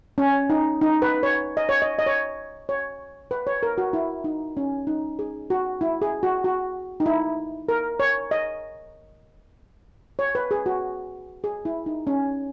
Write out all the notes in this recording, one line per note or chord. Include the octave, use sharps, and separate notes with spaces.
C#4
D#4
D#4
B4
C#5
D#5
C#5
D#5
D#5
C#5
C#5
B4
C#5
A#4
F#4
E4
D#4
C#4
D#4
G#4
F#4
E4
G#4
F#4
F#4
D#4
E4
A#4
C#5
D#5
C#5
B4
G#4
F#4
G#4
E4
D#4
C#4